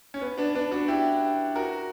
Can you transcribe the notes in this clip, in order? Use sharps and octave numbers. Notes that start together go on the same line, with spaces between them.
C#4
B3
B3 D4
B3 D4
D4 F#4
E4 G4
F#4 A#4